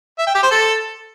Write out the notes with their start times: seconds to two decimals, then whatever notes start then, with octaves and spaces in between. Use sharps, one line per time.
0.19 E5
0.27 G5
0.35 G4
0.43 C5
0.51 A4